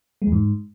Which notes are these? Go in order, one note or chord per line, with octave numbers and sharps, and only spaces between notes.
G#3
E2
G#2